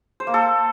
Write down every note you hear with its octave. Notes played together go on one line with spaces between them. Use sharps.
C5
A#3
A4